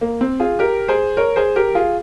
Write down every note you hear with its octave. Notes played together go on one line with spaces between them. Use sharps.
A#3
C4
F4 G#4
G4 A#4
G#4 C5
A#4 C#5
G#4 C5
G4 A#4
F4 G#4